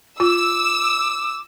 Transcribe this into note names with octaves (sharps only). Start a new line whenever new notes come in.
F4 D6 E6